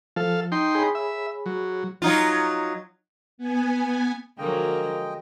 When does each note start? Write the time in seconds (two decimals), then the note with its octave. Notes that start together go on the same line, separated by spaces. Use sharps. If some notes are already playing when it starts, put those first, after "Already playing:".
0.16 F3 A4 F5
0.52 D#4 G5 C6
0.75 G#4 C#5 B5
0.95 E5
1.46 F#3
2.02 F#3 D#4 F4
3.38 B3 G#5
4.38 D3 F3 F#3 G#3 A#3 D#5 G5